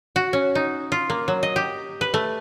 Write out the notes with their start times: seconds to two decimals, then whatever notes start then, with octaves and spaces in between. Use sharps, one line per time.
0.16 F#4
0.33 C#4
0.55 D#4
0.92 F4
1.10 A#3
1.28 F#3
1.43 D#5
1.56 G4
2.01 B4
2.14 A3